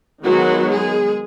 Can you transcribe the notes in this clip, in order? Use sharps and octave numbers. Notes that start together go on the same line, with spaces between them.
D#3 F#3 G#3 B3 F#4
G#3 G#4